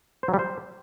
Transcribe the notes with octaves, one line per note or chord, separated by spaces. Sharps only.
C5
F#3
G3
C5